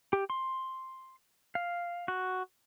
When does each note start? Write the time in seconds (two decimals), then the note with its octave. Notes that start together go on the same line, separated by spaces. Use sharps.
0.13 G4
0.30 C6
1.55 F5
2.08 F#4